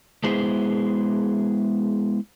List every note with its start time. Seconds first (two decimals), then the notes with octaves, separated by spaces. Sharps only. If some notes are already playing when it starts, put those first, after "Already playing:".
0.24 G#3 B3 E4 G#4 C5